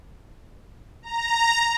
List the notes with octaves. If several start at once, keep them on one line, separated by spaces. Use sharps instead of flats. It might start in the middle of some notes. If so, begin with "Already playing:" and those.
A#5